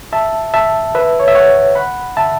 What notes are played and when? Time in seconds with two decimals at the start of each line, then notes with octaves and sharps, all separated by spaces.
0.13 E5 A5
0.54 E5 A5
0.95 B4 E5
1.20 C#5
1.28 E5
1.35 C#5 F#5
1.75 F#5 B5
2.17 E5 A5